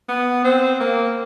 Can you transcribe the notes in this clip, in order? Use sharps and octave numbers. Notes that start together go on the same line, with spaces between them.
B3
C4
A#3